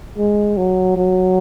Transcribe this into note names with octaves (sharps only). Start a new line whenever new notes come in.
G#3
F#3
F#3